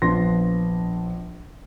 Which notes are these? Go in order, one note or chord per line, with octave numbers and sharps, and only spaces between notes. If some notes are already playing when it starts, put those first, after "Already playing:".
A#1 F3 B3 D4 C6 A#6